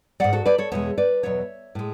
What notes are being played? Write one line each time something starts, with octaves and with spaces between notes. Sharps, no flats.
G#2 F#3 D5 F#5
F#4 A4
B4 D5
A4 C#5
E2 B2 G#3 C#5 E5
B4 D5
E2 B2 F#3 C#5 E5
A2 G#3